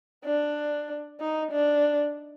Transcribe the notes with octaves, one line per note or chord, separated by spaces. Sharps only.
D4
D#4
D4